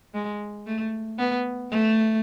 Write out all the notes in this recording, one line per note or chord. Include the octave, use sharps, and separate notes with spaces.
G#3
A3
B3
A3